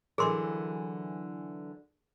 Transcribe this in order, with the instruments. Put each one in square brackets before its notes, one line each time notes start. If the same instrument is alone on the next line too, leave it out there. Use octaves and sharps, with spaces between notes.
[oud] D3 E3 F#3 [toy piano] G#4 A#4 C6